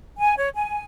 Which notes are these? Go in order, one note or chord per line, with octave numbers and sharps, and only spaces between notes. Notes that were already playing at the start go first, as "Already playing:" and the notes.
G#5
C#5
G#5